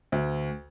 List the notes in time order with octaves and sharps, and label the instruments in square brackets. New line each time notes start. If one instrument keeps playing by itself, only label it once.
[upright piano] D2